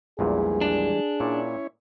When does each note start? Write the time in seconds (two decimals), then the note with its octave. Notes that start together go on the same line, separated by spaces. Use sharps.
0.19 A#1 E2 A#2 E3 G3 G#3 G#4
0.61 D4
1.20 A#2 C#4 E4 C#5 D5